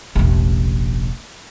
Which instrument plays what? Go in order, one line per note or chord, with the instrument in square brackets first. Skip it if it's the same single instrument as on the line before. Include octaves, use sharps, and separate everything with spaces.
[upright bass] E1 A1